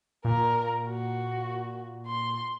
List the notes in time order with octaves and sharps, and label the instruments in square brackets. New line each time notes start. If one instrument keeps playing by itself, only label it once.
[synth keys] A#2 [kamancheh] A#4 A#5
[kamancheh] F#4
C6